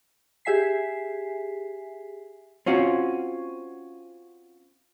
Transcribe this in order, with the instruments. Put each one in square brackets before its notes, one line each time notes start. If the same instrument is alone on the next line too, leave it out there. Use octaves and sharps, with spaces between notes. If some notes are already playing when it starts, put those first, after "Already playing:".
[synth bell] G4 G#4 E5 G#5 B6 C7
[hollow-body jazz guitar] C4 C#4 F4 F#4